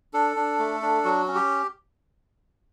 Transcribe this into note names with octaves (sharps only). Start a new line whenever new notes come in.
D4 A4
D4
A3
D4
F#3 F#4
C#4
G4